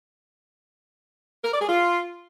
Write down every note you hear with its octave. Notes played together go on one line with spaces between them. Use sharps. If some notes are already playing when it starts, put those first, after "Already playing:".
A#4
D5
G#4
F4